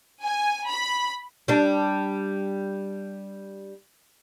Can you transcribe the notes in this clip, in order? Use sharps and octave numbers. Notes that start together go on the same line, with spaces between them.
G#5
B5
G3 D4